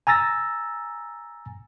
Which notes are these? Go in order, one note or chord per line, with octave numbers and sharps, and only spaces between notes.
G#5 A#5 E6 A6 A#6